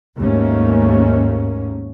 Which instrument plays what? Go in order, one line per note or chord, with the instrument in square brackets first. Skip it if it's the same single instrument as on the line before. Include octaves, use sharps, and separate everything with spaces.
[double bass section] D#2 G#2 A3 A#3 C#4